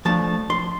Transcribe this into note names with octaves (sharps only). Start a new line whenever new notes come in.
F3 A3 D4 A5
C6